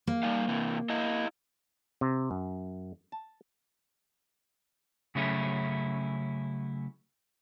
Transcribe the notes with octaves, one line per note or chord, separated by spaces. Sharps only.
A#3
G3 D#4 F5
C3 E3
E4 D#5 F5
C3
F#2
A5
C#3 F#3 A3 C#4 E4 G#4